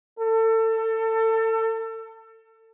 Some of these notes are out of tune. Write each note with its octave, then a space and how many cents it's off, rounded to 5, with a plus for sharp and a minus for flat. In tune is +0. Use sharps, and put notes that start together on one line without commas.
A4 +30